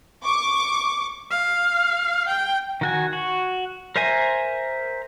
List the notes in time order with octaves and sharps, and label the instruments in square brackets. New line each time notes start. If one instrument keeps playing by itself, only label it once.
[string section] C#6 D6
[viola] F5
G5
[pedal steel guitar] D#3 F#4 G#5
F#4
A#4 C5 E5 G#5 A#5